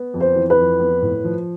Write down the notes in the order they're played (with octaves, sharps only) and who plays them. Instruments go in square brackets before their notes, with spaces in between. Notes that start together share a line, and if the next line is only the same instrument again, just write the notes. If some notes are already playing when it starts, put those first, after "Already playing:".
Already playing: [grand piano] B3
F2
[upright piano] C5
[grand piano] E3
[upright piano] B4
[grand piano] F2
B3
A2
F3